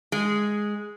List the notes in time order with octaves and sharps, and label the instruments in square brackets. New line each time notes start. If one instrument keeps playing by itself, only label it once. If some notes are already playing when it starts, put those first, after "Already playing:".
[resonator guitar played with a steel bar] G#3